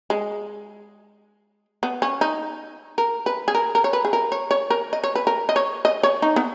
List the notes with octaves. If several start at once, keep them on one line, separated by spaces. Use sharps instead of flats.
G#3
B3
C#4
D#4
A#4
B4
G#4
A#4
A#4
C#5
B4
G#4
A#4
C#5
C#5
A#4
D#5
C#5
B4
A#4
D#5
C#5
D#5
C#5
D#4
B3